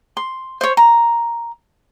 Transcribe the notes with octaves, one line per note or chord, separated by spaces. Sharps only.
C6
C5 C#5
A#5